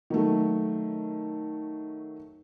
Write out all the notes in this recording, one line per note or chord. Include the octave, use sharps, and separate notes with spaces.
D#3 F#3 A3